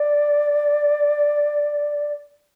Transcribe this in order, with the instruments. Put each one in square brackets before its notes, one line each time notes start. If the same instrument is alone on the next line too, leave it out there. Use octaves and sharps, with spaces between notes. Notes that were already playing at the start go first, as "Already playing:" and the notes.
Already playing: [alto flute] D5